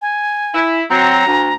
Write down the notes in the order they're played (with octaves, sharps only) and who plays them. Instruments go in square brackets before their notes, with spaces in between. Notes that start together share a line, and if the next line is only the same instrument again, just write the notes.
[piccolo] G#5
[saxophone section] E4
[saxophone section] F#3 C4 [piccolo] A#5
[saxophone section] D2